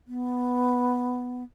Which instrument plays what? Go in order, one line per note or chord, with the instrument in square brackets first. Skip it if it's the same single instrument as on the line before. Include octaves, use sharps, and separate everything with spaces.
[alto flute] B3